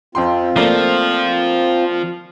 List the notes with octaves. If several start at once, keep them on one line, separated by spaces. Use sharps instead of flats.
F2 C4 F4 G5 C6
F3 A3 A#3 D5